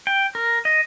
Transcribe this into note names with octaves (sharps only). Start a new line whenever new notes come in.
G5
A#4
D#5